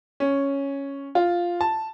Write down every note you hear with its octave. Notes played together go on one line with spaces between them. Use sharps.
C#4
F4
A5